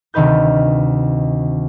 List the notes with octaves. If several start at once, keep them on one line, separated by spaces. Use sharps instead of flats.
D2 C3 D#3 D#4 B4 G6